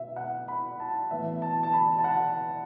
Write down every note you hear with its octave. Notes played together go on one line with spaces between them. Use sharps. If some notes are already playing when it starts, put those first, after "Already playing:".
Already playing: B2 E5
F#5
B5
A5
A2 E3 B3 E5
A5
A5
B5
A5
F#5